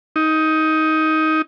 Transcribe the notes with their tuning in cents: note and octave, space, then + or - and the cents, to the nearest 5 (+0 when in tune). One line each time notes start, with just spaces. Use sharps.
D#4 +15